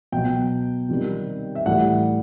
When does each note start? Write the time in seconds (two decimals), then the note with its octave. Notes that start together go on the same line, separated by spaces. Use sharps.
0.12 B2 F#3 G5
0.89 C3 D#3 G3
1.55 E5
1.66 A2 E3 G3 F#5